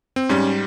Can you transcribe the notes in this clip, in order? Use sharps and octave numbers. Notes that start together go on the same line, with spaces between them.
C4
G#2 G3 C#4